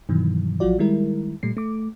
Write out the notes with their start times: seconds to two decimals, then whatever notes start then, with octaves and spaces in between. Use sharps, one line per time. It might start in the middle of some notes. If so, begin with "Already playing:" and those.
0.09 G2 B2 D#3 E3 F#3
0.60 A1 F3 F#3 F4 F#4 D5
0.79 D#3 G3 G#3 E4 A#4
1.43 A#2 G3 A3 C7
1.57 A3 D6